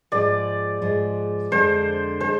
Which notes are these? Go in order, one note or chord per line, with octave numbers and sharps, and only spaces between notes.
G#2 F3 G#3 D5
G#2 F3 G#3
F2 D3 G#3 C5
D3 G#3 C5